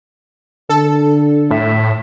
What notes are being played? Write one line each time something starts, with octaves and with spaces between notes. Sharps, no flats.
D3 A4
A2 E5